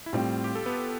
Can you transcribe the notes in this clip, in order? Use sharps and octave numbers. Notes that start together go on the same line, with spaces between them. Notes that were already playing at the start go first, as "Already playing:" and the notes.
E4
A2 G3 C4 F4
G4
A4
B3 B4